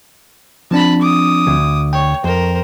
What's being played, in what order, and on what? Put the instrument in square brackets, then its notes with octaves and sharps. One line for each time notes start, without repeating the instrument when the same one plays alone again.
[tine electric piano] F3 C4 D4 [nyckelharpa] A5 B5
[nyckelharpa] D6 D#6
[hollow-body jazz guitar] D2
[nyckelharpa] C#5 [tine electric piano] G5
[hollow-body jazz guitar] F2 [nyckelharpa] A#4 C5